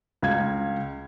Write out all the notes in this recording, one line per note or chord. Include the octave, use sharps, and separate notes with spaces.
C#2 F5 G#6